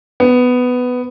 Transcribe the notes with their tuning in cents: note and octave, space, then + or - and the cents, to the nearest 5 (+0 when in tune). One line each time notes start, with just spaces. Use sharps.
B3 +10